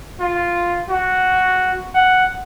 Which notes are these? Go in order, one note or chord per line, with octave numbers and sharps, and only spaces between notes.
F4
F#4
F#5